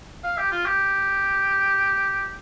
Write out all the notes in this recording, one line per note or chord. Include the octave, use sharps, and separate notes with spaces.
F5
G4
F4
G4